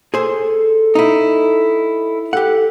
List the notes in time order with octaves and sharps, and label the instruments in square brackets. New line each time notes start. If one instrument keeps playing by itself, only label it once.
[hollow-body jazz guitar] G#4 C5 [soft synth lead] A4
[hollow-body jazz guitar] D#4 E4
[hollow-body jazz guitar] G4 F#5 [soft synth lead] A4